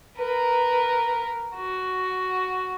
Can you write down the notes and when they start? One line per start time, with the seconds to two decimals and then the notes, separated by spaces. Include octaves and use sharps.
0.16 A#4 B4
1.55 F#4